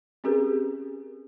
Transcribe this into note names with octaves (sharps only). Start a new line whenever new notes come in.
C4 C#4 G4 G#4 A#4 B4